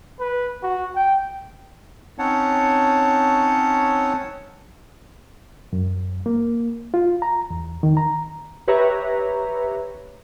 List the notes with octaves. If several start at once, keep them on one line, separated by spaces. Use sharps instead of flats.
B4
F#4
G5
C4 C#4 D#4 C#5 F#5 A5
F#2
A#3
F4
A#5
E2
D#3
A#5
G4 B4 C#5 E5 A#5